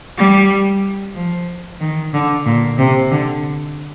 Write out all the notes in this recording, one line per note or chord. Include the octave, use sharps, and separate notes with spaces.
G3
F3
D#3
D3
A#2
C3
D3